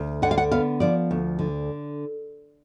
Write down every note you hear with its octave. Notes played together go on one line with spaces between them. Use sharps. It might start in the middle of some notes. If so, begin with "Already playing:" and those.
Already playing: D2
D3 F#5
F5
F#5
B3 F5
F3 D5
D2
D3